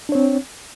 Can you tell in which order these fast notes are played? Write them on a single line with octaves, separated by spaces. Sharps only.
D4 C#5 C4